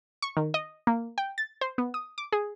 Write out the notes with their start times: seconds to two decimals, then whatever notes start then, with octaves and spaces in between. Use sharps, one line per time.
0.22 C#6
0.37 D#3
0.54 D#5
0.87 A#3
1.18 G5
1.38 A6
1.61 C5
1.78 B3
1.94 D#6
2.18 D6
2.32 G#4